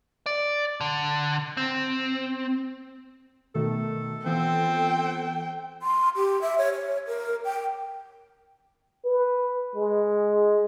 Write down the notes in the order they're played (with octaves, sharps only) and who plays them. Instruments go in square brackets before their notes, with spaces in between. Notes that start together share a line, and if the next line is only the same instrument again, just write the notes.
[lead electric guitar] D5
D3
C4
[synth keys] B2 D#3 A3 [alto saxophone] A4
[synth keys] E3 B3 F4 [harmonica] C4 [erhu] G5
[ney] C6
G4
E5
C#5
C#5
A#4
G5
[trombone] B4
G#3